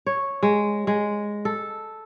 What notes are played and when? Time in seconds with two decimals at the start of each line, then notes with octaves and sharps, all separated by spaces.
0.06 C#5
0.43 G#3
0.87 G#3
1.45 A4